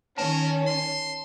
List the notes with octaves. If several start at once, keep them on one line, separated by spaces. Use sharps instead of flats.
D#3 C#4 A#4 A5 E7
C6